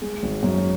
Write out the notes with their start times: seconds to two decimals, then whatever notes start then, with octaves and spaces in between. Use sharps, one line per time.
0.02 G#3
0.23 G#1
0.43 F#2